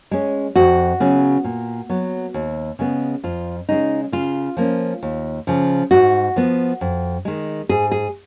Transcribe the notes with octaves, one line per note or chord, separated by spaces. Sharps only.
G#3 C#4
F2 F#4
C#3 F#3 B3
A#2
F#3 B3
D#2
C#3 G#3 B3
F2 F4
C#3 G#3 D#4
C#3 F4
F3 A#3 C#4
D#2
C#3 F3
G#2 F#4
F3 B3
F2
D#3 G#3
G#2 G#4
G#4